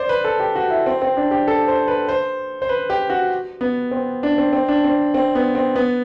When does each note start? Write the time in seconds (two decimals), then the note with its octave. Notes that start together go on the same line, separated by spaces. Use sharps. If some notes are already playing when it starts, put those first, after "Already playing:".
Already playing: C5 D5
0.09 B4
0.25 A4
0.40 G4
0.55 F#4
0.70 E4
0.86 C4
1.02 C4
1.17 D4
1.31 G4
1.48 A4
1.68 C5
1.88 B4
2.08 C5
2.62 C5
2.69 B4
2.90 G4
3.10 F#4
3.61 B3
3.91 C4
4.23 D4
4.38 C4
4.53 C4
4.68 D4
4.84 C4
5.14 C4
5.35 B3
5.55 C4
5.76 B3